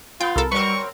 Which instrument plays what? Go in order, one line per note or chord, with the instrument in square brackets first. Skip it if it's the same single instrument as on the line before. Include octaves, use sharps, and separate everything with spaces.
[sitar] B3 [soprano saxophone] F4 [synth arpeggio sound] G5
[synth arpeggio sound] C2 A4 [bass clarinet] A#4
[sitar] F#3 C4 A#4 [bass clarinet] G3 [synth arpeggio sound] B4 [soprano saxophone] C#6